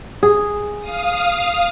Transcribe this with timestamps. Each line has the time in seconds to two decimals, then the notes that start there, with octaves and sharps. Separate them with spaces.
0.23 G#4
0.79 F5 D#6